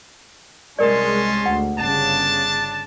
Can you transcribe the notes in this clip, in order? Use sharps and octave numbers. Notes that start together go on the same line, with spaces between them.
C2 G#3 C#4 A#4 D5 A5 C6
D2 F#5
G1 C#3 D4 A5